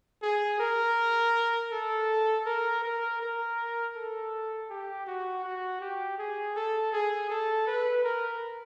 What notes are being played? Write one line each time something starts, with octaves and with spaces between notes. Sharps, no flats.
G#4
A#4
A4
A#4
A#4
A#4
A4
G4
F#4
F#4
G4
G#4
A4
G#4
A4
B4
A#4